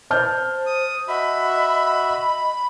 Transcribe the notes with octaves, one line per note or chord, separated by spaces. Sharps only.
C5 A5 F6 G6
D#6
F#4 D#5 E5 B5